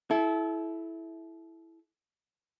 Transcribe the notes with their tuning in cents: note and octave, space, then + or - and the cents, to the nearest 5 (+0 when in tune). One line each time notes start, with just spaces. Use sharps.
E4 +0 A4 -35 E5 +0